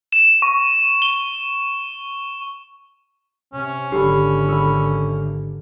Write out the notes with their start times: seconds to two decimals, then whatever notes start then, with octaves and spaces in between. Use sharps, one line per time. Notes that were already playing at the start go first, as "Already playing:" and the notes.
0.13 E7
0.42 C#6
1.02 G7
3.54 C3 C#4
3.92 G#1 D3 D4 G4 A4 B5
4.48 A4 B5